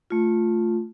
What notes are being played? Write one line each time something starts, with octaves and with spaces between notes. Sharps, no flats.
A3 F4